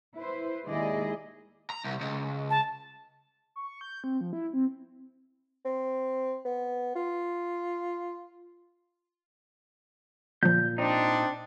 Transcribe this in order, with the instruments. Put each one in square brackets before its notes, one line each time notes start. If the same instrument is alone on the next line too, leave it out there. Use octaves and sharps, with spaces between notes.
[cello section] E4 B4 C5
D#2 G#3 E4 G#4 D5 D#5
[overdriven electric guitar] A#5
C2
C#2
[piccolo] A5
[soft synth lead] C#6
G6
C4
F3
E4
C4
[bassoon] C4
B3
F4
[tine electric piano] A#2 [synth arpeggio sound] D3 F3 [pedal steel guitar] G6
[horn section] C4 D4 [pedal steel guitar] D#4